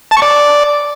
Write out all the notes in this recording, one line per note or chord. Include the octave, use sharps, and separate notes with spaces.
A5
C#6
D5